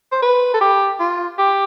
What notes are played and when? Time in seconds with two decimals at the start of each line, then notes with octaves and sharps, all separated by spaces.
0.12 C5
0.22 B4
0.54 A4
0.61 G4
1.00 F4
1.38 G4